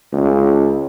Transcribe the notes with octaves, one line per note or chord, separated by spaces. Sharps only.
C#2